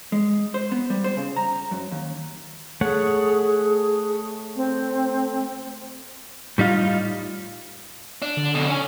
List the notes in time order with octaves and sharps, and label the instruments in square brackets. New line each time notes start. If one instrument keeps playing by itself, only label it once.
[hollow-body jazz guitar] G#3
C5
B3
G3
C5
C#3
A#5
F#2
D#2
[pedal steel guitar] A3 C#5 F#5 [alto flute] G#4
[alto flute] C4
[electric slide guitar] A2 G3 D#4 F4
[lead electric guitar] D4
[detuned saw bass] D3
[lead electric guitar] F2 B2
C#4 G#5